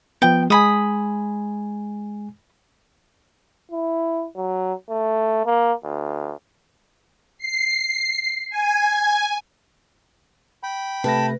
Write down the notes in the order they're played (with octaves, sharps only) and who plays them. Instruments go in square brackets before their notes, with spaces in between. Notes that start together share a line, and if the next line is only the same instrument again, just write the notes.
[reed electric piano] F3 B3 [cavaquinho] G5
[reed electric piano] G#3 G#5 [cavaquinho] B5 D#6
[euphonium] E4
F#3
A3
A#3
D2
[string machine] C7
G#5
[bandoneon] G5 B5
[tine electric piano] C3 A3 A#6 [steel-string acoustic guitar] B4 [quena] A5